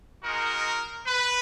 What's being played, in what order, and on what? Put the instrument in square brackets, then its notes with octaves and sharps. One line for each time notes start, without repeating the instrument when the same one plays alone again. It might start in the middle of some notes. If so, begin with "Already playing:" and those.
[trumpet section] G#3 D#4 F#4 A#4
B4